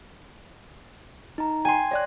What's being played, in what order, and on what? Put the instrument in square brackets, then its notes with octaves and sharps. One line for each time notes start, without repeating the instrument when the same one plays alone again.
[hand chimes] D#4 A#5
[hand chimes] G5 [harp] G#5 C6
[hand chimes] C#5 D5 F#6 [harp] A#6